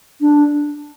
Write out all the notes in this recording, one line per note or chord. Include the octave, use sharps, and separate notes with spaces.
D4